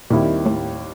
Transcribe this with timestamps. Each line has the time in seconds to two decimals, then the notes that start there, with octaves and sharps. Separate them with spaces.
0.10 D#2 A#2 D#3 G3 C4 E4
0.46 A2